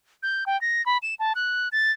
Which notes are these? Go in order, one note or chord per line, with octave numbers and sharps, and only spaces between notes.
G6
G5
A#6
B5
E7
A5
F#6
A6